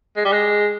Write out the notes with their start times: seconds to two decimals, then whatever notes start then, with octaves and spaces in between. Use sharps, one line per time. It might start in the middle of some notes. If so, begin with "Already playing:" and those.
0.17 G#3
0.25 G3
0.32 G#3